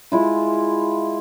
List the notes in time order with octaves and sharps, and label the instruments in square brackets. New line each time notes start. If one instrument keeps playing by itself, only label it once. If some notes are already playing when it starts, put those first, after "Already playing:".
[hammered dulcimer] G#3 E4 F4